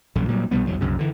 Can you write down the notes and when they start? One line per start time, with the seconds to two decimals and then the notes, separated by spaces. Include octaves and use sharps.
0.15 A#1 F#2 D3
0.28 A#2 F#3 G3
0.51 B1 B2 G3 B3
0.67 B1 E2 G#2 F#3
0.81 C2 F#2 C#3
0.99 D3 E3